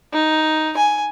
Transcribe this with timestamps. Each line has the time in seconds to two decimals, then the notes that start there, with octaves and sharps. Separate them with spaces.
0.13 D#4
0.77 G#5